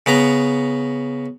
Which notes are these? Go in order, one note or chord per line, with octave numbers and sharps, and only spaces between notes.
C#3 B3 A#5